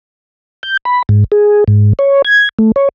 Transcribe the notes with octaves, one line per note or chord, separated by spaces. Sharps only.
G6
B5
G#2
G#4
G#2
C#5
G#6
A3
C#5